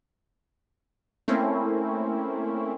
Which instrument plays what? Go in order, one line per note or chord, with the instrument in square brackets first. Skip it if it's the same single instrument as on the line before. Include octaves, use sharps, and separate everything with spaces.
[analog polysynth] A3 A#3 C4 C#4 E4